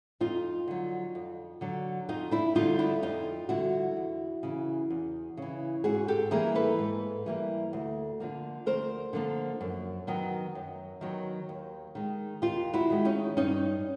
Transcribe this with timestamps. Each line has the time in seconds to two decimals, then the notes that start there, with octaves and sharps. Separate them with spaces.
0.20 F2 D#4 F4
0.67 D3 F#3
1.15 F2
1.61 D3 F#3
2.09 F2 D#4 F4
2.31 D4 E4
2.55 D3 G3 D#4 F4
2.79 D4 E4
3.02 F2 D#4 F4
3.49 D3 G3 E4 F#4
3.97 E2
4.43 C#3 E3
4.90 E2
5.37 C#3 E3
5.84 G#2 F#4 G#4
6.08 G4 A4
6.31 E3 G3 A#3 G#4 A#4
6.55 A4 B4
6.78 G#2
7.26 E3 G3 A#3
7.73 D2
8.20 D3 F3 A#3
8.66 D2 A#4 C5
9.13 D3 F3 A#3
9.61 F#2
10.07 D#3 F#3 B3
10.55 F#2
11.01 D#3 F#3 B3
11.49 D#2
11.95 D#3 G#3
12.42 D#2 F4 G4
12.73 E4 F#4
12.90 D#3 G#3
13.05 C#4 D#4
13.37 G2 C#4 D#4